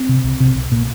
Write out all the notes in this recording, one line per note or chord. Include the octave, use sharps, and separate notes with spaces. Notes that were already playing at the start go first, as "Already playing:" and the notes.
Already playing: C4
C3
C2
C3
C2
A#2